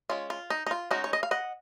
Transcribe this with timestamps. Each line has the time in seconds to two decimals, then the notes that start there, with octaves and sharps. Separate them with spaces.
0.09 G#3 C#4 F4
0.30 F4
0.50 D#4
0.67 D#4
0.71 F4
0.91 G#3 C#4 D#4 F#4
1.04 C#5
1.13 D#5
1.23 F5
1.31 D#5 F#5